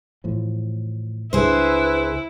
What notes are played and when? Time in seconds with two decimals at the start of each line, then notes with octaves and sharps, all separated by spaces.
0.24 A2 E3 F3
1.33 C#2 D4 E4 G#4 B4 C5